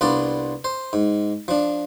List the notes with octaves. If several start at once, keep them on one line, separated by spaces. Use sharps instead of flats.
C2 B3 D4 F4 D5
C5
G#2
F3 D4